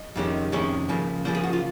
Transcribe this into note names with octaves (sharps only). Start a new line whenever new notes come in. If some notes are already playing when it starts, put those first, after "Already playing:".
Already playing: D#5
F2 C3 D#3 G#3 C#4
F2 C3 D#3 G#3 C#4 C#5
C#3 F3 A#3
C#3 F3 A#3 C5
G#4
F#4
F4